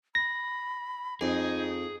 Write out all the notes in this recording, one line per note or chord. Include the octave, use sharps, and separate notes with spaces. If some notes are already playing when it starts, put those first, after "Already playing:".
B5 A#6
F2 D#4 G#4